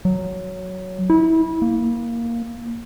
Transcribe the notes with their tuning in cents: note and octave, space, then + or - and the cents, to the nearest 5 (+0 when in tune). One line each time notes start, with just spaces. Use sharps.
F#3 +5
E4 -25
A#3 +0